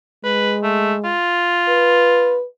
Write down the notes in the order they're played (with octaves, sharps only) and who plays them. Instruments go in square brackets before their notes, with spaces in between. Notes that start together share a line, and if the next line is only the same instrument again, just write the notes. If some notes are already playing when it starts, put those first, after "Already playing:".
[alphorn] G#3 [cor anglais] B4
[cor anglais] A3
F4
[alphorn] B4